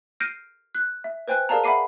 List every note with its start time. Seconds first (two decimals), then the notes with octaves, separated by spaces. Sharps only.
0.20 F6 G6 A#6 C7 D7 D#7
0.75 F#6
1.04 E5
1.28 B4 C5 G5 G#5 F#6
1.49 G#4 A#4 D5 F5 A5 A#5
1.64 E5 F#5 B5 D6 C7 D#7